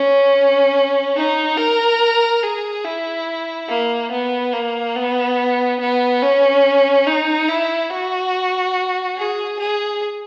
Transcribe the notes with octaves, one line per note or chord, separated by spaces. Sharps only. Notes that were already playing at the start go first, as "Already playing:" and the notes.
Already playing: C#4
D#4
A#4
G#4
E4
A#3
B3
A#3
B3
B3
C#4
D#4
E4
F#4
G#4
G#4